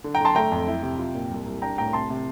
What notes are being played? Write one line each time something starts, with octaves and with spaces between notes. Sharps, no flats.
D3
G5 A#5
D3 A5 C6
A3 G5 A#5
F2
E4
C3
F4
A#2
C2
C2
D4 G5 A#5
A2 G5 A#5
C3 A5 C6
C3